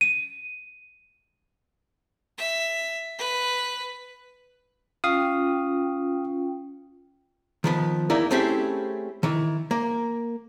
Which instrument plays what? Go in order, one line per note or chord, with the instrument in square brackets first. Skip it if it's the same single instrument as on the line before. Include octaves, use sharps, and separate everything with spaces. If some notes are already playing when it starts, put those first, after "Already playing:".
[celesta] D#7
[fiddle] E5
B4
[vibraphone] C#4 F4 G5 [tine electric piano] F5 D#6
[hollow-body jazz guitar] D#3 F3 B3
E2 A#3 D#4 E4 A#4 D5
A3 C4 C#4 E4 G4 G#4
D#3 E3
A#3